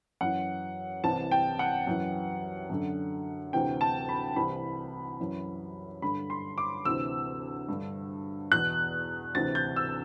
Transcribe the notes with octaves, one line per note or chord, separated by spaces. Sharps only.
F#2 E3 F#5
C2 C3 E3 A5
G5
F#5
F#2 E3
F#2 D3
D2 C3 E3 G5
A5
B5
C2 C3 E3 B5
F#2 E3
G2 D3 B5
C6
D6
D2 C3 E3 E6
G2 D3
E2 B2 F#6
D2 C3 E3 A6
G6
E6